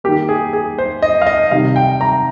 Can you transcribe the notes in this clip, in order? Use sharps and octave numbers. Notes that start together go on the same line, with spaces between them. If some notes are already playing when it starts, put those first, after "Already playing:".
D#3 A#3 G4
G#4
G#4
C5
D#5
F5
D#5
C3 D#3 G3 F5
G5
A#5